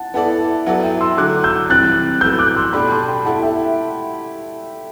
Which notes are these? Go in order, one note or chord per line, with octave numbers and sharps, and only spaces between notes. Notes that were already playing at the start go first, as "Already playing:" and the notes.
Already playing: F#5 A5
B3 E4 A4 D5 F#5 A5
E5
F#3 B3 E4 A4 D5 F#5
E5 G5
C6 E6
D3 F#3 A3 D6 F#6
E6 G6
C3 E3 G3 C4 F#6 A6
A2 F#3 B3 E6 G6
D6 F#6
C6 E6
B2 A3 D4 G4 D5 B5 D6
A5 C6
G5 B5
A3 E4 G4 F#5 A5
E5 G5